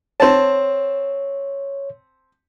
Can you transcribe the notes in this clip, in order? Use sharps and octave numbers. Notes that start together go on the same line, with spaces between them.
C4 C#5 A5